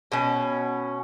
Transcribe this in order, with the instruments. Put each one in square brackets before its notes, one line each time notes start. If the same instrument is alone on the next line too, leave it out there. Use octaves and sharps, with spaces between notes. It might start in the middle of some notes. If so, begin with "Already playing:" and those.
[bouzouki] B2 C#4